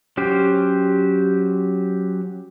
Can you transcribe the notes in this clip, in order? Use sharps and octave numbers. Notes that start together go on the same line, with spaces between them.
F#3 C#4 G4 C5